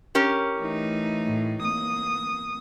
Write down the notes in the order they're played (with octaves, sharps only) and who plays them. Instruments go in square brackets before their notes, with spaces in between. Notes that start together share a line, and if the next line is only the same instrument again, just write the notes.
[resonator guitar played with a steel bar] C#4 G4 A#4
[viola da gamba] E3 A3 D#4
[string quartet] A2
[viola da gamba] A#3 [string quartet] D#6